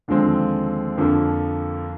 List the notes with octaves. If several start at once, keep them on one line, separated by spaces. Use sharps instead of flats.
D#2 D3 F3 G#3 C4
F2 D3 F3 A#3